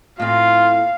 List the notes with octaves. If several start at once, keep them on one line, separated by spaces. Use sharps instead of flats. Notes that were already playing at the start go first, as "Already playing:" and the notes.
A2 C4 F4 F5